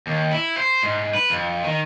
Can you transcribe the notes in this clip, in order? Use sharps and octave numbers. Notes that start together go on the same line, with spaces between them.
D#2
E4
C5
G#2
B4
F2
D#3